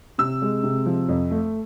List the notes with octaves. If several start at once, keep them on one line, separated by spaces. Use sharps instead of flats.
C3 E6
G#3
C3
F3
F2
A3